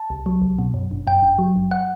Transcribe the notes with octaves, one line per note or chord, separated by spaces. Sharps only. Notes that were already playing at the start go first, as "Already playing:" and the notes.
Already playing: A5
C2
F#3
C2
B2
F#2
G1
F#2 G5
G1
F#3
G1
F#5